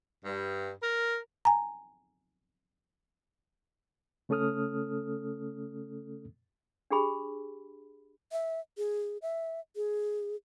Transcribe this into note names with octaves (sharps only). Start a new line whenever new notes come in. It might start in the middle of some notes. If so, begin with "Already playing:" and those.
G2
A#4
G#5 A#5
C#3 A3 C#4 A4 D#6 F6
D4 G4 G#4 B5
E5
G#4
E5
G#4